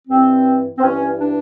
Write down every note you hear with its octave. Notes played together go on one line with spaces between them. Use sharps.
G2 E3 C4
C4
G2 E3 C#4
D4